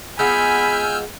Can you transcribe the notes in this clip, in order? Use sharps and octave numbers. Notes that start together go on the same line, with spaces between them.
G#3 B3 F4 G#5 B5 E6 F6 G6